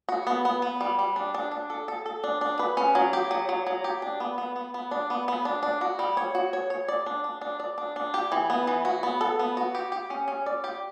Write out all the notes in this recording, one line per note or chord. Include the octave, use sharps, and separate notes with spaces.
F#4
B3
B3
B3
G3
G3
D4
D4
D4
A4
A4
A4
D4
D4
B4
C#4
F#3
G4
F#3
F#3
F#3
G4
D4
B3
B3
B3
B3
D4
B3
B3
D4
D4
F#4
G3
C#5
F#4
C#5
C#5
D5
D4
D4
D4
D5
D4
D4
G4
E3
B3
E3
F#4
B3
A4
B3
F#4
G4
G4
C#4
C#4
D5
G4